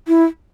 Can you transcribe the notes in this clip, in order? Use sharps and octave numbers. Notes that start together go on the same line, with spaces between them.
E4